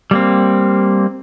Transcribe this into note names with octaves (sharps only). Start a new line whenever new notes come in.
G3 A#3 C4